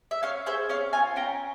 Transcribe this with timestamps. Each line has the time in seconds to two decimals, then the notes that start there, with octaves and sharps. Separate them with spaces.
0.11 E5
0.23 C#4 C#5 F5
0.46 G#4 C5 E5
0.69 C#4 C#5 F5
0.93 F4 F5 G#5
1.16 C#4 G5 A#5